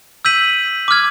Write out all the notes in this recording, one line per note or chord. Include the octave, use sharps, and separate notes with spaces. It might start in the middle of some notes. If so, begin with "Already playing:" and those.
E6 G6 B6 D#7 F#7
D6 F6 G#6